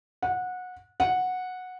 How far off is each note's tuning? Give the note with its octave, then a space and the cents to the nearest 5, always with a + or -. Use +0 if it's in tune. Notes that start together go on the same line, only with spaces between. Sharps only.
F#5 -20
F#5 -10